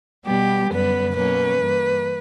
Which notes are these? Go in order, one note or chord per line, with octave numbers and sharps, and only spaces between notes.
B2 G3 B3 G4
F#2 D3 G3 B3 B4
B2 F#3 A#3 C#4 B4
G2 E3 A#3